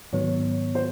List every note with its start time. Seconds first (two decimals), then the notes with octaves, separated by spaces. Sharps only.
0.13 G#2 D#3 F#3 B3 C#5
0.75 C5